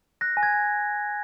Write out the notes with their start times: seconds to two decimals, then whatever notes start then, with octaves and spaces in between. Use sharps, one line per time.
0.21 F#6 A#6
0.37 G#5
0.43 G#6
0.54 G#5